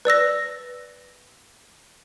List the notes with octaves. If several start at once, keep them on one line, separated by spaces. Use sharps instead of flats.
B4 D5 E6 A#6